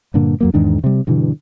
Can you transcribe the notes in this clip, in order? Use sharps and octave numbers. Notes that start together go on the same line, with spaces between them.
G2 A#2 D3 A#3
F2 F#3 A#3
E2 G#2 D#3 D4
C3 G3
G2 B2 D3 E3